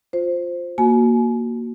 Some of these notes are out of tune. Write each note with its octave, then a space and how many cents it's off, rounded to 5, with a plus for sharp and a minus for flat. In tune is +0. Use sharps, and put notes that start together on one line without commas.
F4 +10 C5 +0
A#3 +5 F#4 +0 G#5 +35